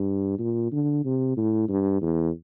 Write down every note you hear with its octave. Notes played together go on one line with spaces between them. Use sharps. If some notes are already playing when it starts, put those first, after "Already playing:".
Already playing: G2
A#2
D3
C3
A2
G2
E2